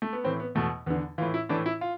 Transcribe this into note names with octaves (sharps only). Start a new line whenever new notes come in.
A3
B3
A2 E3 C4
B3
E2 B2 A3
E2 D3 B3
A2 E3 F4
E4
A2 E3 D4
E4
F4